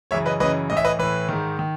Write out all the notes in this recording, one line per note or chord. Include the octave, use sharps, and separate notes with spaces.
F#2 C#3 E3 C#5 E5
B4 D#5
F#2 C#3 E3 B4 D#5
A2 E3 D#5
E5
B4 D#5
A2 E3 B4
G#2 D#3
D#3